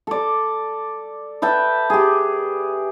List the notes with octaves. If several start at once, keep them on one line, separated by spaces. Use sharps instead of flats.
A4 D5
B4 E5 G5 A5
G4 G#4